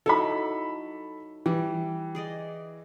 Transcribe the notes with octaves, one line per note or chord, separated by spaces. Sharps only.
F#3 D#4 E4 A4 B5
E3 G3
G#4 D5 D#5